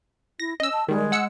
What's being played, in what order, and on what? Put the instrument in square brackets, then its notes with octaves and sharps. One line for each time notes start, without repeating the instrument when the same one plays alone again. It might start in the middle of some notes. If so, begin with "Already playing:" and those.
[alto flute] E4 [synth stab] A#6
[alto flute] C#4 [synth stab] D#5 E6
[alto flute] A5
[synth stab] D#3 G3 [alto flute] G#3
[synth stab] F#5 E6 C#7